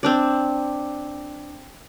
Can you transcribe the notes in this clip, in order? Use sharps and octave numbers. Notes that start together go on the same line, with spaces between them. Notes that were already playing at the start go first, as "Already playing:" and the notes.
C4 D4 D5